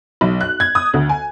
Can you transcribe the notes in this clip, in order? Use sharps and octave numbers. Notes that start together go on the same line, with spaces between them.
B1
F#6
G#6
D#6
D2
G#5